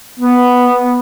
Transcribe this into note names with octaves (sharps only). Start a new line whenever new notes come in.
B3